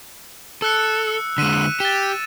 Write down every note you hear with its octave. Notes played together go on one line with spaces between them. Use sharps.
A4 E6 F#6 C#7
D3 G#3 B6 D#7 E7
G4 A6 E7